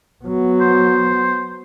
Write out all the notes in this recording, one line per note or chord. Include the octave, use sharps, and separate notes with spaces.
F#3 B3
C5